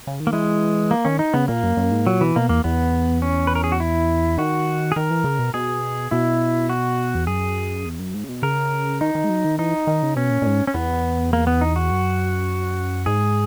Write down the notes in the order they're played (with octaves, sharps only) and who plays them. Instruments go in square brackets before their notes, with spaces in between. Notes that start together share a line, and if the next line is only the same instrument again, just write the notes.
[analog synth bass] C#3
D#3
[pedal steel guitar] A#3
[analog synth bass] E3 [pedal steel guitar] G#3
[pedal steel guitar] A#3
[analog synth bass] D#3 [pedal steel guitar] C#4
[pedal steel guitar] D#4
[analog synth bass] C#3 [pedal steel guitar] B3
[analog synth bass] A#2 [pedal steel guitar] A#3
[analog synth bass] F#2
F#2
G#2
[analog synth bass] A#2 [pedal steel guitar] F#3
[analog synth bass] B2 [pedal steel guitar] E3
[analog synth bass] B2 [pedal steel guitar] A#3
[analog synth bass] E2 [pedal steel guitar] A#3
[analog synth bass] E2 [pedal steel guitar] B3
[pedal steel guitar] C#4
B4
A#4
G#4
F#4
E4
[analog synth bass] D#3 [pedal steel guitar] F#4
[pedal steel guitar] G#4
[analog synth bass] D#3 [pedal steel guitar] A#4
[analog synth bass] E3
C#3
B2
[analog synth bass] B2 [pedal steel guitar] G#4
[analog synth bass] B2 [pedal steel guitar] E4
[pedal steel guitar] F#4
[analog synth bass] E2
[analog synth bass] F#2 [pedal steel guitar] G#4
[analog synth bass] E2
F#2
G#2
C#3
B2
[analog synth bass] C#3 [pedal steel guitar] A#4
[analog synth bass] D#3 [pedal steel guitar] D#4
[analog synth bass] D#3
G#3
F#3
D#3
[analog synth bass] E3 [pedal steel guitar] D#4
[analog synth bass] D#3
C#3
[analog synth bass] B2 [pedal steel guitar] C#4
[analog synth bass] A#2
A#2
G#2
[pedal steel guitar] C#4
[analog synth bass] E2 [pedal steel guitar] B3
[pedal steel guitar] A#3
B3
D#4
F#4
[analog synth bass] F#2
[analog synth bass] G#2 [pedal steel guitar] G#4